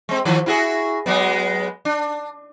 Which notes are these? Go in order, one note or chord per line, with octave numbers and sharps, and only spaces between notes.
G#3 C4
D#3 F3
E4 F#4 G#4
F#3 G#3 B3
D4